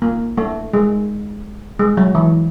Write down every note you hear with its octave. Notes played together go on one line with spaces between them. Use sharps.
A#3
A3
G#3
G#3
F#3
E3